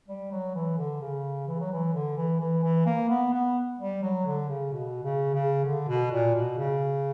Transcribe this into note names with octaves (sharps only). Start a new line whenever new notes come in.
G3
F#3
E3
D3
C#3
E3
F#3
E3
D3
E3
E3
E3
A#3
B3
B3
G3
F#3
D3
C#3
B2
C#3
C#3
D3
B2
A#2
B2
C#3